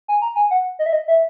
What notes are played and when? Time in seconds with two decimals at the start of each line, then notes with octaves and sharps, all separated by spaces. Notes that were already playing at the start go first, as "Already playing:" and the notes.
0.08 G#5
0.22 A#5
0.36 G#5
0.51 F#5
0.79 D#5
0.86 E5
0.93 D#5
1.08 E5